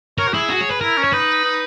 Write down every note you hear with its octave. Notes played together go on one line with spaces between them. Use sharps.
A#4 C#5
F#4
E4 G#4
F#4
C#5
B4
E4 A#4
C#4
C#5
D#4 B4
D#4